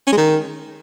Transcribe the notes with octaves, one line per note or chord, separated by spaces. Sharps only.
C#4
G#3
D#3